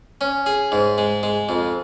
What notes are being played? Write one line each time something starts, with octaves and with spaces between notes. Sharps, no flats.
C#4
G#4
G#2
G#3
G#3
F2